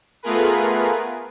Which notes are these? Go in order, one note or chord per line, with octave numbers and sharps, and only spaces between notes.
A3 B3 F4 G#4 A#4 B4